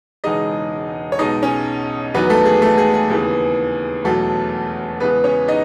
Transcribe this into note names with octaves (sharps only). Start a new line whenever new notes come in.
E1 E2 C#3 G#3 D#4 D#5
C#5
B1 B2 G#3 D#4 D#5
C#4 C#5
E2 D#3 F#3 B3 B4
A3 A4
G#4
A3 A4
G#4
G#4
D#2 C#3 E3 B3
E1 E2 B2 F#3 A3 A4
E2 C#3 G#3 B3 B4
C#4 C#5
D#4 D#5